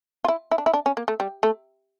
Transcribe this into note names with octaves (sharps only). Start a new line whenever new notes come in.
F4
E4
E4
D4
E4
D4
C#4
A#3
A3
G3
A3